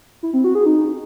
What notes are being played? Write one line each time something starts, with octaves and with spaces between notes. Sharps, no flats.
E4
C4
F#4
G#4
D#4